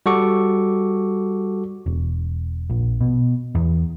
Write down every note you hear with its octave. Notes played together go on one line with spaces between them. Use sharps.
G3 F#4 A4 C#6 D6
E1
A#1
B2
E2